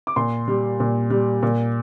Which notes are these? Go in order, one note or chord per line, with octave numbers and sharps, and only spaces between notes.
D6
A#2 C6
G3
A#2
G3
A#2